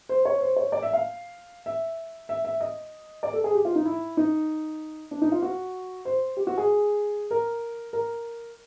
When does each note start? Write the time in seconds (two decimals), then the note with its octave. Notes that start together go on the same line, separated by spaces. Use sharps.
0.09 C5
0.25 C#5
0.41 C5
0.56 C#5
0.72 D5
0.83 E5
0.93 F5
1.66 E5
2.29 E5
2.45 E5
2.61 D#5
3.23 D5
3.33 A4
3.44 G#4
3.54 G4
3.65 F4
3.75 D#4
3.86 E4
4.17 D#4
5.11 D4
5.22 D#4
5.32 F4
5.42 F#4
6.05 C5
6.37 G4
6.47 F#4
6.58 G#4
7.31 A#4
7.93 A#4